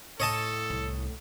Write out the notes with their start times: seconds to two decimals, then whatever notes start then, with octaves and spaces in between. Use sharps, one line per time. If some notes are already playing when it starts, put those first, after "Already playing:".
0.20 A2 A4 C#5 D#5 A5
0.70 C2